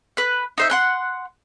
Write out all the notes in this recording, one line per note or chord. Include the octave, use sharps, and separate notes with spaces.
B4 F#6
D#4 C5 E5
F#5 C6 F#6